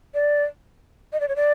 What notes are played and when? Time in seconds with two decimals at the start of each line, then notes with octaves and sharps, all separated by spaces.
0.14 D5
1.13 D#5
1.20 D5
1.28 C#5
1.36 D5